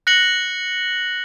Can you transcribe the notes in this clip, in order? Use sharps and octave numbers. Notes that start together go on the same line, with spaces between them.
F#6 A#6 C#7 F#7